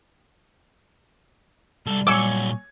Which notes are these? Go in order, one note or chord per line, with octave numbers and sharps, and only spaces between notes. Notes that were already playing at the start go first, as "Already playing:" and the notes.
C2 G3 A4
A#2 F#3 C#5 G#5 D6 E6 G#6 C#7